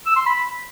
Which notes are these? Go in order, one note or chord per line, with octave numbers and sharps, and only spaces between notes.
E6
C6
B5